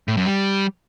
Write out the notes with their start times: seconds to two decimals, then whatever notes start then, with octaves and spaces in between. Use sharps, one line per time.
0.08 A2
0.17 F#2
0.26 G3